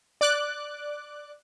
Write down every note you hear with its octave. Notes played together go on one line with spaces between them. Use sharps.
D5 D6 F#6